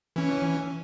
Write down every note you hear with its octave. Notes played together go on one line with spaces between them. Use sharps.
E3 C#4